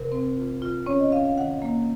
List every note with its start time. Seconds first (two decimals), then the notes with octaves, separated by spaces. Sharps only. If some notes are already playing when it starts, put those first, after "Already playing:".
Already playing: C3 A#4
0.12 C4
0.37 F4
0.62 F4
0.86 C#4 C#5
1.00 D#5
1.12 C#4 F5
1.25 F5
1.38 D#3 F#5
1.62 A#3